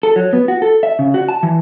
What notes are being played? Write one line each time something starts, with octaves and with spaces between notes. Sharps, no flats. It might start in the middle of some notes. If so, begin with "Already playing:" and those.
A4
F#3
B3
F#4
A4
E5
C#3
F#4
A5
E3